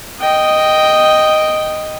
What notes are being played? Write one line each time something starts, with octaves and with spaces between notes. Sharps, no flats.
D#5 G5